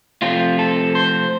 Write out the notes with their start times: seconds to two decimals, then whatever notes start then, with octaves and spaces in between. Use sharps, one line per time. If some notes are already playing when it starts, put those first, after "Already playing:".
0.22 C3 F3 A3 C4 F4
0.59 A4
0.95 C5